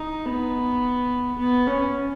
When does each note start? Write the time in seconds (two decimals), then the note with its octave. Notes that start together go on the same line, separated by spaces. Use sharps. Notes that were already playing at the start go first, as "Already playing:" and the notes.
Already playing: D#4
0.25 B3
1.38 B3
1.66 C#4